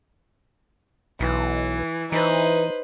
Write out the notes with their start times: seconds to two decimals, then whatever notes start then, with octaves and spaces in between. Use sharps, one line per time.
1.20 B1 E3
2.12 E3 D#4 B4 C5